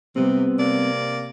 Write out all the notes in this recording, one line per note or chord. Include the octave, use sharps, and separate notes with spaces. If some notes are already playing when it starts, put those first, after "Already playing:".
C3 G3 B3 C4
C3 A#3 D5